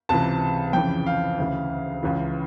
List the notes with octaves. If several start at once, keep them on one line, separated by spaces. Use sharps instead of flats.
C#2 C3 E3 A5
F2 C#3 E3 G5
F5
D2 C#3 E3
C#2 C#3 E3